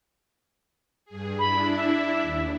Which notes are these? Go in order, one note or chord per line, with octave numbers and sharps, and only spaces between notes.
G2 G#4
D4 E4 B5
E5
D#2